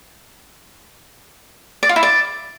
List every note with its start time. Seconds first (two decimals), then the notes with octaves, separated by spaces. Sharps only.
1.83 D5
1.89 F4
1.96 E4
2.03 D5